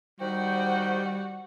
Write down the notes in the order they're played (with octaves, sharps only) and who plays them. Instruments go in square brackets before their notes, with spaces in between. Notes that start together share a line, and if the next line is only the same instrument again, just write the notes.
[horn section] D#3 G4 G5 [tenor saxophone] G3 [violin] F#4 F#5 [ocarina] C5